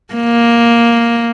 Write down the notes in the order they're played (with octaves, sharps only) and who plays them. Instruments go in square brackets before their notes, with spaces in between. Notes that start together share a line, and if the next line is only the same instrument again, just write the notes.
[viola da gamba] A#3